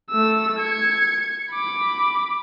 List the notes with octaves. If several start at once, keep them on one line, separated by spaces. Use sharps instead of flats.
A3 E6
G#6 C#7
B5 D6